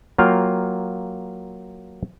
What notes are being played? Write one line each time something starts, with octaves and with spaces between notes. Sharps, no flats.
F#3 A#3 F4 F5 G5